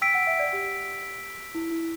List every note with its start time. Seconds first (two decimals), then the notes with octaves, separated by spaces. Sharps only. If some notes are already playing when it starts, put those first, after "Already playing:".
0.02 G5 E6 B6 D7
0.14 F#5
0.27 E5
0.39 D5
0.53 G4
1.55 E4
1.71 E4